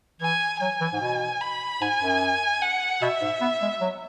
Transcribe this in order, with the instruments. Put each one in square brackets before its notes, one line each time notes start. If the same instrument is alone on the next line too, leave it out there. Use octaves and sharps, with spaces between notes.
[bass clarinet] E3 [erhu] G#5
[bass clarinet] F#3 [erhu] G#5
[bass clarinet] E3
G#2
B2
[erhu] B5
[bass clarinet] G#2 [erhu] G#5
[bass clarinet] F#2
[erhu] F#5
[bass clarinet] B2 [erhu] E5
[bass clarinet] G#2
B3
G#3
F#3